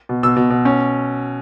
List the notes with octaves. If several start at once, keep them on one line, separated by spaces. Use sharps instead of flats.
B2
B2 E6
B2
B2
C#4